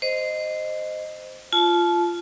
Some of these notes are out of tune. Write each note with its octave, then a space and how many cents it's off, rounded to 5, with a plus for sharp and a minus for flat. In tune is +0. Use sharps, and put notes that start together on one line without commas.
C5 -10 D#5 -10
F4 -10 A5 -30